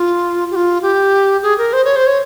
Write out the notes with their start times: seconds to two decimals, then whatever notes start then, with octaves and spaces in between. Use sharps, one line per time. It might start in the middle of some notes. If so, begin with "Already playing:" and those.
Already playing: F4
0.51 G4
0.56 F4
0.82 G4
1.43 G#4
1.58 A#4
1.73 C5
1.85 C#5
1.96 C5
2.07 C#5